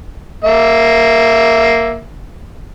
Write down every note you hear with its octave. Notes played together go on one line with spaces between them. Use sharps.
A#3 E5